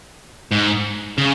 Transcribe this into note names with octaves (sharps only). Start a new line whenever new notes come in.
G#2
C#3